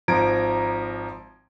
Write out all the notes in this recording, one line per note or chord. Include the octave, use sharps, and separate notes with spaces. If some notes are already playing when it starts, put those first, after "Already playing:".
G#1 F3 A#5 G#6 D7